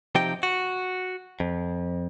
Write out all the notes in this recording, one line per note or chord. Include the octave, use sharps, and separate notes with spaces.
C3 F3 D#4 G4 D#5 G5
F#4
F2